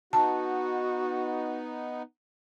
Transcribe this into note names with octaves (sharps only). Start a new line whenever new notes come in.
B3 D#4 F#4 A5